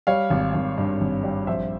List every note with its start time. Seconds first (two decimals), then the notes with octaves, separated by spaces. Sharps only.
0.07 G3 C#5 F5
0.30 G#1
0.54 G#1
0.78 G2
1.01 G#1
1.23 G3
1.47 A#1 C5 E5